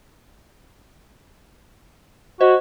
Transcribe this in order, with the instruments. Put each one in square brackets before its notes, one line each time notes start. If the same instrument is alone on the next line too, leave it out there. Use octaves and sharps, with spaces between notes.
[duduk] F#4 [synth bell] C5 D#5